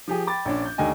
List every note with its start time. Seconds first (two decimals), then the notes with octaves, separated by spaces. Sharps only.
0.08 F3 G4 G#4
0.27 G5 B5 D6 A6
0.45 A#1 C#4 D4
0.66 G6
0.78 D#2 D3 A3 D#5 G#5